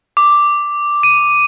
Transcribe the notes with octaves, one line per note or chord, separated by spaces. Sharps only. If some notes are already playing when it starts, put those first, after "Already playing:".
D6
D#7